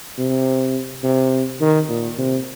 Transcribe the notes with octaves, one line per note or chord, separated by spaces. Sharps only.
C3
C3
D#3
A#2
C3